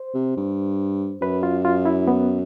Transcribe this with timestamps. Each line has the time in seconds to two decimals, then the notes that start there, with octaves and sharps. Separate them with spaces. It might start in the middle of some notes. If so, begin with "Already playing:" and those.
Already playing: C5
0.14 C3
0.37 G2
1.21 F#2 B4
1.43 F4
1.65 F4
1.85 E4
2.07 B3